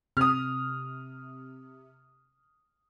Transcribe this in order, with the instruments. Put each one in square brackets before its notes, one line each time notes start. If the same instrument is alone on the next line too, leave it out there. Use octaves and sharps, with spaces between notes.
[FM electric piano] C3 [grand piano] D#6 F6